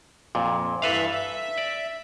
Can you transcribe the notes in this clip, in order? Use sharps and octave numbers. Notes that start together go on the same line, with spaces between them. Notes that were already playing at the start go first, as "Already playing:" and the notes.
F2 A#2
G2 E3 A4 B4 E5 F5
E5
D5